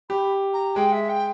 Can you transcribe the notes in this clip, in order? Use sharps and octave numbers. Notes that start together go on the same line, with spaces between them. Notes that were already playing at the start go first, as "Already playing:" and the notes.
G4 B5
A#5
G#3 G5
E5
G5